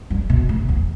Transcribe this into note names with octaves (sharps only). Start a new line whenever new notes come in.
G2
B2
A2
E2